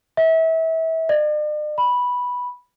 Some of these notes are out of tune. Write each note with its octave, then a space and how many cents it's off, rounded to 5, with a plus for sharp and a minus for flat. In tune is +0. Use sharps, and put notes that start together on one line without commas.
E5 -30
D5 +45
B5 -5